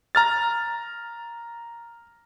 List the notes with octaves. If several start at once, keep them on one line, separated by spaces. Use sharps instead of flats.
A#5 F6 A6